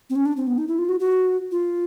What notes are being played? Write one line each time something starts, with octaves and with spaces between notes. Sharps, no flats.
C4
C#4
D4
C4
B3
D#4
E4
F4
F#4
F#4
F4